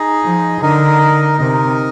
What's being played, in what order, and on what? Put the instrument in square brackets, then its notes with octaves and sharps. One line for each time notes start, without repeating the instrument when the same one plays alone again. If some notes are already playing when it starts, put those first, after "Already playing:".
Already playing: [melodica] D#4 G#4 D#5
[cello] F3
[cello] D3 [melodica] D#4 A#4 D#5
[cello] C3 [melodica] D#4 A#4 D#5